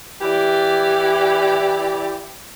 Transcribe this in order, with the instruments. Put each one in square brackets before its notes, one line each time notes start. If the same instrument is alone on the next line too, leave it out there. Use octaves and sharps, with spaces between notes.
[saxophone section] E3 E4 G4 D5